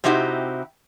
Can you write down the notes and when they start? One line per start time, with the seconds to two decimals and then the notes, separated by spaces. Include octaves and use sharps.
0.04 C3 C4 D#4 E4 F#4 G4